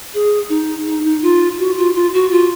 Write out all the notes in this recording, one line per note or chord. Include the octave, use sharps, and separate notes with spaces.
G#4
D#4
D#4
D#4
F4
F#4
F4
F4
F#4
F4